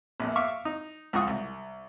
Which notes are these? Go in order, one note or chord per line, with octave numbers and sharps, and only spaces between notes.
A#1 E2
E5 F5 C#6 D6
D#4
C#2 G#2 F4 F#5 C#6 D#6
C2